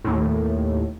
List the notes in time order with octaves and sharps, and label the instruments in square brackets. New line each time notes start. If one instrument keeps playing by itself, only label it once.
[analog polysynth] D#2 A2